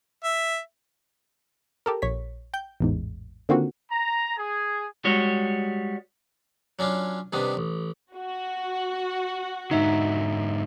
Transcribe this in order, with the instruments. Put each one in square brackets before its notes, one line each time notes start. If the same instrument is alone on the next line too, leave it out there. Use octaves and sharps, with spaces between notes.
[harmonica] E5
[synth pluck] G4 A4 A#4
A#1 C#5 B6
G5 G6
A1 E2 G#2
D3 D#3 A#3 C4 F4 F#4
[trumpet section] A#5
G#4
[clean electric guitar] G3 G#3 F#4 C#5
[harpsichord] F#3 C#4 D4 F4
G2 C3 D#3 B3 D4
A1
[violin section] F#4
[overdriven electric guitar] G#2 D3 [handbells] D#4 E5